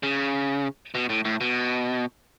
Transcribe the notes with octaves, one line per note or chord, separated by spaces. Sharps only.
C#3
B2
A2
A2
B2